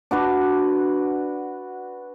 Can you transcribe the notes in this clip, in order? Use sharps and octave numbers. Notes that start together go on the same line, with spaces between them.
D4 F#4 B4